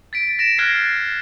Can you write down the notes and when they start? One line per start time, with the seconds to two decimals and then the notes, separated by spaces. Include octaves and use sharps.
0.13 A6 B6 D7
0.39 A#6 D7 E7
0.58 F6 F#6 G#6 A6 C7